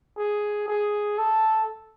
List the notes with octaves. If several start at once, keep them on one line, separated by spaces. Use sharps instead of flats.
G#4
G#4
A4